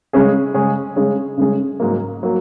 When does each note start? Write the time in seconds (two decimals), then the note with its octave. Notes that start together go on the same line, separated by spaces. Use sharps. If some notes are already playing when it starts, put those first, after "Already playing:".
0.13 C#3 G#3 C#4 G#4
0.54 C#3 G#3 C#4 G#4
0.96 C#3 G#3 C#4 G#4
1.37 C#3 G#3 C#4 G#4
1.80 G#2 F#3 A#3
2.23 F#3 A#3